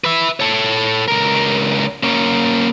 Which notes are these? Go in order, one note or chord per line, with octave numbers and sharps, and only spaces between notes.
B4 E5
A4 C#5
C#2 A#4
A#3 C#4